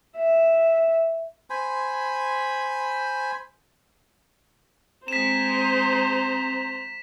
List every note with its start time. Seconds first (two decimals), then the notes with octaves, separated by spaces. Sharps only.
0.16 E5
1.50 C5 G#5 B5
5.08 G#3 C4 G#4 C5 A#5 B6 E7